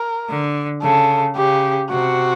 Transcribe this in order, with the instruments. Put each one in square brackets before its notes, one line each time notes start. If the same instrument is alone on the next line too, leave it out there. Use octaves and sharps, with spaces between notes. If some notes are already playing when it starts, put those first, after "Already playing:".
Already playing: [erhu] A#4
[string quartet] D3
[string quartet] C#3 [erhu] A4
[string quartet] C#3 [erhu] G4
[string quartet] C3 [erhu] F#4